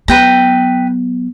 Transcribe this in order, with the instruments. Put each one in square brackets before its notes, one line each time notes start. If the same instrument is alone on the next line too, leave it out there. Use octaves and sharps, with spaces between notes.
[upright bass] F#3 B3 [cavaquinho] B4 G5 A#5